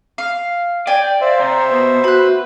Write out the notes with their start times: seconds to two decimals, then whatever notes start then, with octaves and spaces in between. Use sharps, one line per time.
0.18 F5
0.87 D5 G5 G#5
1.21 C5 E5 F5
1.40 C3 A#5
1.70 B2 B3
2.04 F#4 B4 B5 F#6